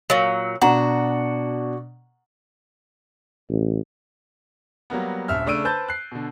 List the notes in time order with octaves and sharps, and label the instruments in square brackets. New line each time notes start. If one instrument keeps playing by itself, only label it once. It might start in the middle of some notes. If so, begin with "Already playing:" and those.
[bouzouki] A#2 F#3
[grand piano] B2 D4 [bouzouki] F#4 [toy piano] F#5 A#5
[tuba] A1
[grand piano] F#3 G3 A#3 B3
D#1 A#1 E5 F6
C#3 A3 D4 E6 D7 D#7
B4 C5 A5 G6 A6
F#6 C7
B2 D3